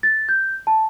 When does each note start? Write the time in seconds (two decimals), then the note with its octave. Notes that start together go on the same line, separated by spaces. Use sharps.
0.03 A6
0.29 G6
0.67 A5